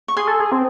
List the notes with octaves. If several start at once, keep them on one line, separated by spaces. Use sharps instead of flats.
C#6
G#4 G#5 C6
A4
G#4
C4